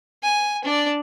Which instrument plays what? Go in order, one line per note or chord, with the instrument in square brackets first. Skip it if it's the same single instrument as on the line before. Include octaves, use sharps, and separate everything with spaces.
[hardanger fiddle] G#5
D4 D5